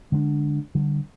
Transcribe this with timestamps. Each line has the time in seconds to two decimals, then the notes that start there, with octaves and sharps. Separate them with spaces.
0.12 D3 G#3 A3 D4
0.75 D3 G3